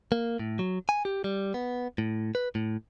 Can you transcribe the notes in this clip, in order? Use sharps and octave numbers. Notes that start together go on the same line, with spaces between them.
A#3
A2
F#3
G#5
G4
G3
B3
A2
B4
A2